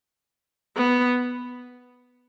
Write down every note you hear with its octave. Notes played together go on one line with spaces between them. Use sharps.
B3